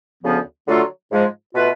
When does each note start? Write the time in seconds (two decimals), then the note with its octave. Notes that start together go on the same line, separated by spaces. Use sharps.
0.22 D2 C#3 F3 B3
0.67 D3 F#3 A3 F4 A4
1.10 G#2 F3 G#3
1.54 B2 A3 F4 B4